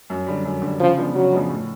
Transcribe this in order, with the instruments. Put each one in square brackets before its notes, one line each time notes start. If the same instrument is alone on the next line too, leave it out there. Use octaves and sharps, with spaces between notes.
[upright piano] F#2
D3 G3
F#2
D3 G3
[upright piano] C#3 [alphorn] F3
[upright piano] F3 G#3 B3 D4
[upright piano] C#3 [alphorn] F#3
[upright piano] F3 G#3 B3 D4
A2